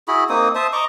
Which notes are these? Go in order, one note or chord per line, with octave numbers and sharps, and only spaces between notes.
E4 F#4 G#4 B5
A#3 C4 D#4 D#6
C5 E5 A5 D#6
D#5 A#5 C#6 D6